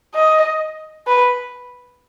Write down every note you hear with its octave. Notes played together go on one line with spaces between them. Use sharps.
D#5
B4